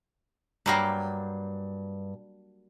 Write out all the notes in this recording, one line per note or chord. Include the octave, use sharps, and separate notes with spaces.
G2 F#3 G3 A#3